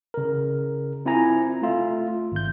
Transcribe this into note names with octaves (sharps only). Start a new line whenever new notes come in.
C#3 A#4
C4 E4 F4 G#5 A#5
A3 F4 E5
G#1 G6